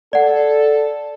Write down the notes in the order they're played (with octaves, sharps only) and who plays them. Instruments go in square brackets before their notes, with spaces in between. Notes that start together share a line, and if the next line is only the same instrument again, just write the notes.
[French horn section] A4 [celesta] D5 F#5